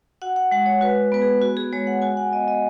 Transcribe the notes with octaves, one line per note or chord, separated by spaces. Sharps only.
F#4 F#5
F#5
G#3 F#5
C#5
F#4 B4
B3 B4
G#4
F#4
G#4
G#3 C#5
F#5
F#4 G#5
F#5
B3 D#5
D#5